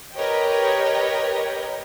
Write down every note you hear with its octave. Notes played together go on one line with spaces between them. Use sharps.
G4 A#4 B4 C#5 D#5 G5